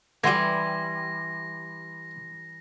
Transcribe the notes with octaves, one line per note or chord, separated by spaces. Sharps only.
E3 G3 A3 F#4 G5 C6 G#6 A#6